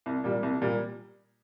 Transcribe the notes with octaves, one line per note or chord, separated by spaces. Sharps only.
C2
A#2 G3
C2
A#2 G3